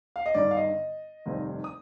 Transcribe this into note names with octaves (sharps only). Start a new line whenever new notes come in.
F5
D#5
G1 G2 D#3 D5
F5
D#5
F1 D#2 D#3 G3 C4
D#6